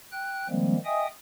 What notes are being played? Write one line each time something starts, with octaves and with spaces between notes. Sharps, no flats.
G5 F#6
D#3 F3 G3 G#3 A#3 C4
D#5 E5 G5 G#5 D#6